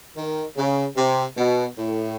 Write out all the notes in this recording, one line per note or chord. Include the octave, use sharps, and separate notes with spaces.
D#3
C#3
C3
B2
A2